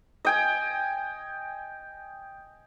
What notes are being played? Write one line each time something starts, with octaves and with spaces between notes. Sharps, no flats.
D#5 G5 G#5